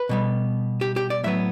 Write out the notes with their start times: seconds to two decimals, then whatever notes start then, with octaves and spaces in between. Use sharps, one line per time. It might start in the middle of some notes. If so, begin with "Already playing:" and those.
Already playing: B4
0.09 B2 G3 B3
0.81 G4
0.96 G4
1.10 D5
1.24 A2 F#3 B3 E5